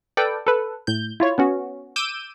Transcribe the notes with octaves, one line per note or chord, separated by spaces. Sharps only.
A4 B4 D5 G5
A4 B4
A2 G6
E4 F4 C#5
B3 C#4 F#4
D6 E6 G6 D#7